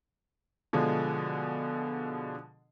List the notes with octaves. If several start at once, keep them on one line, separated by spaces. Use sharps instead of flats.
B2 D3 F3 G#3